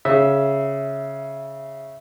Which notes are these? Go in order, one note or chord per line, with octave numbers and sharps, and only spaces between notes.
C#3 E5